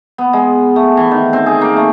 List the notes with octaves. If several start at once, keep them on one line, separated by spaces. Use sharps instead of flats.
B3
G#3
A3
E3
D#3
C4
G#4
A#3
A3